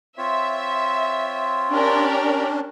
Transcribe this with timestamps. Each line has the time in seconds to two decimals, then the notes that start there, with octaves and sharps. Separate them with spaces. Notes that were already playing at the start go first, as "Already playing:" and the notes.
0.18 C4 F4 C#5 E5
1.70 C#4 D4 G4 A#4 D5